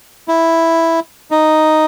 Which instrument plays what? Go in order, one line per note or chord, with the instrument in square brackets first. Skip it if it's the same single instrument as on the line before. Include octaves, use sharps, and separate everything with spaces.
[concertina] E4
D#4